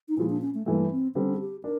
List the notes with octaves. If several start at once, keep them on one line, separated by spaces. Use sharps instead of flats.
D#4
A#2 F3 G#3 E4
D4
C#4
A3
G2 E3 A3 A#3
C4
D3 G3 C4 C#4
G#4
G4
D4 A#4